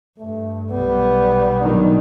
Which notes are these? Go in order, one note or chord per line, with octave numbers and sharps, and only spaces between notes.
G2 A3
B1 G3 B3
B2 D#3 F#3 D4